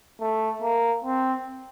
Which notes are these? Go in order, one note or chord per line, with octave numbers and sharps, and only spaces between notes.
A3
A#3
C4